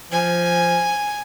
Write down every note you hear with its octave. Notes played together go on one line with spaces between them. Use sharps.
F3 G#5